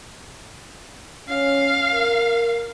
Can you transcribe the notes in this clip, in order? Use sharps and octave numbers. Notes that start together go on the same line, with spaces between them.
C#4 F5
A#4